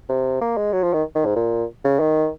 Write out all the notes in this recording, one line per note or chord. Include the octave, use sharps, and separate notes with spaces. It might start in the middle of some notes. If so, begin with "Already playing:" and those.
C3
A#3
G#3
F#3
F3
D#3
D#3
G#2
A#2
C#3
D#3